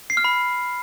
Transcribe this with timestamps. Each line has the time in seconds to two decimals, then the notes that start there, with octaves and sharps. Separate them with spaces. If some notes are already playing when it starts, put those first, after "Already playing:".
0.10 C7
0.17 F6
0.24 B5